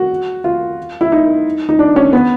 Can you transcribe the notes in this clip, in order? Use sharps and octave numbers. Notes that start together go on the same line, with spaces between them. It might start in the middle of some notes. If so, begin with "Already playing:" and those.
Already playing: F#4
F4
E4
D#4
D#4
D4
C#4
B3